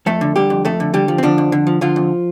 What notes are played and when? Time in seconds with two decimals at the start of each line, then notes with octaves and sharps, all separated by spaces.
0.06 F2 A3 A4
0.21 D3
0.36 D3 G3 G4
0.50 F2
0.65 F2 A3 A4
0.80 D3
0.94 D3 G3 G4
1.08 F3
1.18 C4
1.23 D3 F3 D4
1.38 F2
1.52 D3
1.67 F3
1.81 D3 F3 F4
1.96 F2